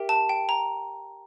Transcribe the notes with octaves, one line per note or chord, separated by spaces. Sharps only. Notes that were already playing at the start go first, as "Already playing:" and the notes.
Already playing: G4 A#4 E5 G5
A5
G5
A#5